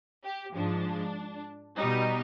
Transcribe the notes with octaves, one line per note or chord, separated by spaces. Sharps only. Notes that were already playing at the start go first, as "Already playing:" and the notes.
G4
G#2 F3 G#3 D4
B2 G3 D#4